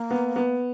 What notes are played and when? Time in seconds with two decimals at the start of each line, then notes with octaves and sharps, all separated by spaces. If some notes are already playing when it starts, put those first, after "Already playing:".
Already playing: A#3
0.11 B3
0.36 B3